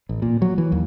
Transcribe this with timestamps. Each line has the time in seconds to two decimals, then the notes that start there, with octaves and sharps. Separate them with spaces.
0.09 A1
0.22 A#2
0.42 F#3
0.58 E3
0.72 D#2